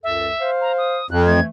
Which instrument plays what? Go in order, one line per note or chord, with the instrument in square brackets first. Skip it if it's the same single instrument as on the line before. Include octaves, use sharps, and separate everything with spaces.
[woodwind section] C#2 F#2 A4 [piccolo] E5
[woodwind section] C5 F5
[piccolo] A#5
D#6
[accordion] F2 [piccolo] F#6
[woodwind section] E3 A3 [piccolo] G#6